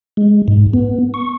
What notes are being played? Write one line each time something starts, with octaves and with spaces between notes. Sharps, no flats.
G#3
G#2
B3
C#6